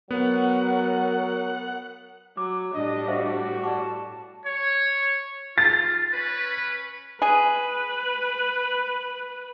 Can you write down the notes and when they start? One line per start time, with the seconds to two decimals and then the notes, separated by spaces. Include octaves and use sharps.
0.11 F#3 B3 A#4 F#5
2.37 F#3 D6
2.74 A2 G3 D4 D#5
3.08 F#4 C5 E5 F5
3.64 D5 F#5 A5 C#6
4.45 C#5
5.58 F4 A6
6.13 C#4 B4
7.22 G#4 B4